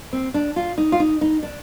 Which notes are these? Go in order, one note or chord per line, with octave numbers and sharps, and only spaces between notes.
C4
D4
F4
D#4
F4
D#4
D#4
D4